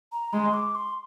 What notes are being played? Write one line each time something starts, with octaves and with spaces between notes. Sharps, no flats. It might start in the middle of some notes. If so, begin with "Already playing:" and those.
A#5
G#3 C6
D6
C6